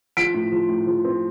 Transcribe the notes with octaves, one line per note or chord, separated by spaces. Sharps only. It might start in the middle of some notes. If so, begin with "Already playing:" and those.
F3 B6 D7
A2
F3
A2
F3
C4